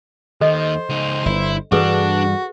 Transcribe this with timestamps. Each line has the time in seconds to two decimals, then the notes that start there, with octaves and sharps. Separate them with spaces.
0.41 D#2 D#3 A4 C5 D#5
0.89 C#2 D#4
1.26 G1 E4
1.72 G2 E3 G3 D4 F#4 G#4 A4 B4